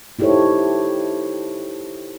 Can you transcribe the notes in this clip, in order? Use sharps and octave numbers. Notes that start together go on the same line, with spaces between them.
D#4 E4 G4 A4 C5 C#5